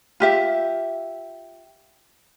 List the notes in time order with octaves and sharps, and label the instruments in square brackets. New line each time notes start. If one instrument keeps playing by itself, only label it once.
[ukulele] F4 G4 E5